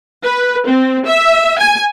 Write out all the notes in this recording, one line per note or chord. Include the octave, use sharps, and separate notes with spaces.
B4
C4
E5
G#5